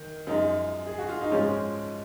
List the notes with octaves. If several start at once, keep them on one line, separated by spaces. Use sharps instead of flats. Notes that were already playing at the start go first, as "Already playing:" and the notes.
Already playing: D#3
F#2 F3 G#3 D#4
G#4
F#4
F4
D#4
G#2 F3 G#3 C#4